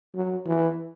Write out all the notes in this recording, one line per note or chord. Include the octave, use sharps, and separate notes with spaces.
F#3
E3